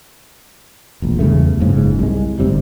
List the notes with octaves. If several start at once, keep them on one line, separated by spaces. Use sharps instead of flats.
E1 A#1
E2 G2 C#3 A3
F#1 C#2 G#2 C#3
C2 G#3
G1 G#2 C3 G3